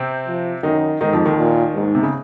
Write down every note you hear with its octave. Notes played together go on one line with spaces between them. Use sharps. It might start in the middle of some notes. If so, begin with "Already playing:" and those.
Already playing: C3 C4
F3
F#2 D#3 D#4
G#2 D#3 D#4
F2 F3
D#2 D#3
A#2
G#2
C3
C#3